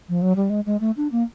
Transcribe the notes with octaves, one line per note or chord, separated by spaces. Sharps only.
F3
F#3
G3
G#3
G#3
A3
D4
A#3